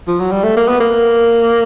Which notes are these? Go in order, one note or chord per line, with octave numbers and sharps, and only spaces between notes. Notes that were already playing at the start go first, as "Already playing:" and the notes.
F3
F#3
G3
A3
A#3
B3
A#3